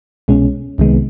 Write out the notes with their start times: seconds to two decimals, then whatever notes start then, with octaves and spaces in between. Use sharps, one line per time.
0.28 C2 B2 G#3 C#4
0.78 C2 C3 D#3 G#3 B3